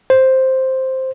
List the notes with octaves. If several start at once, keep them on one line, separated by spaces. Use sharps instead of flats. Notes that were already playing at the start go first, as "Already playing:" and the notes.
C5